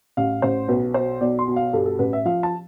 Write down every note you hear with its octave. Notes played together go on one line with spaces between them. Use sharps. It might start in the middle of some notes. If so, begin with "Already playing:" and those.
A1 F5
A1 C5
B1 B4
B2 C5
B1 D5
C6
B2
F5
G2 A4
A4
A1 B4
E5
F3 F5
A5